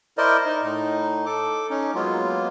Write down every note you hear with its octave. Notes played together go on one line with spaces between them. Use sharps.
E4 A#4 C5 D5 D#5
D#4
A2 D#4
A4 D6
C#4 D#4
F#3 G#3 A#3 B3 F4